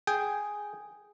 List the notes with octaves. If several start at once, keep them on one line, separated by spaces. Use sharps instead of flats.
G#4 G5